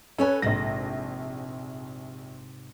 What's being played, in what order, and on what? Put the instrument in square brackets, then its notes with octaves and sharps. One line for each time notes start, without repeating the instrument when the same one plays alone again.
[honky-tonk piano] C#4 B4 [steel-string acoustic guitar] A4 C#5 G#5
[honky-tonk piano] A#1 A#6 [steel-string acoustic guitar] G#2 C3